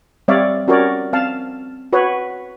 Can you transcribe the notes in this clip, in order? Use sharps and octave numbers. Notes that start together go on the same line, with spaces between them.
G3 C4 C#5 D5 E5 F5
C#4 F#4 G4 A#4 C#5 D5
C4 F5 A5
F#4 B4 C#5